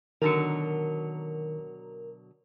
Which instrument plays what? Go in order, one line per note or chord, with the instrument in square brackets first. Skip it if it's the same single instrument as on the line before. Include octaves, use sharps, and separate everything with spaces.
[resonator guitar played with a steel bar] B2 D3 F#3 [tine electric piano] D#3 C#7 [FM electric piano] A#4